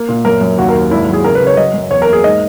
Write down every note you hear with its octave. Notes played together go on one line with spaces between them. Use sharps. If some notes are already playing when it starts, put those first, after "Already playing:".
Already playing: A#3
A#2
F#2 A#4
F#2
D#2 F#4
A#4
D#2
G#1 E4
F#3
G#4
C#3 A#4
B4
C#3
C#5
F#3 D#5
F#2
E2 C#5
A#4
A#3
G#4
G#2 D#5